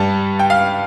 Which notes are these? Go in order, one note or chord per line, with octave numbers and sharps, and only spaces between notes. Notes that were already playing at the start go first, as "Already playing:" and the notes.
Already playing: G2 G3 A5
G5
F5